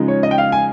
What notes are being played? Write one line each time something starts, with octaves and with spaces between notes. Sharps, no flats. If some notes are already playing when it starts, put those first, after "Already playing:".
Already playing: C#3 F3 G#3 D#4
C#5
D#5
G5
F5
G#5